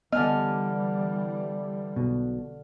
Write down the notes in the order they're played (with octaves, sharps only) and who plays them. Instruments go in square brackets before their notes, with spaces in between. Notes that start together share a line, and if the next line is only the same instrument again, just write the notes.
[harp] D3 F6 [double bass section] E3 G3 [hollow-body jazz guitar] B3 G#5 [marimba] D#5
[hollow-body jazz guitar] B1 B2